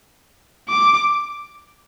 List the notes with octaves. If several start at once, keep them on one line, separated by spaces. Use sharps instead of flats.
D6